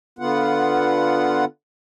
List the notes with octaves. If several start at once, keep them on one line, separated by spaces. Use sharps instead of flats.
D3 B3 F4 F#5